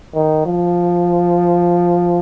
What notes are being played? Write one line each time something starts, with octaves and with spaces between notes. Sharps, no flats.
D#3
F3